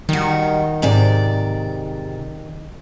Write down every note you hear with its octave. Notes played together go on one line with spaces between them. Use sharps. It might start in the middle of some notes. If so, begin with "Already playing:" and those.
D#3 G3 F#4
G#2 C3 D5